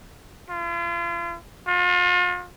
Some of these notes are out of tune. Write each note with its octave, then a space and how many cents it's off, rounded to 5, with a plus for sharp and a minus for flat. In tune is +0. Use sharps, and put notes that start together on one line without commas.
F4 -40
F4 +40